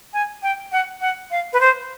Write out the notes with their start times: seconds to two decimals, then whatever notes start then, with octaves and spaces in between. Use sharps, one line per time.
0.13 G#5
0.43 G5
0.72 F#5
1.01 F#5
1.31 F5
1.53 B4
1.61 C5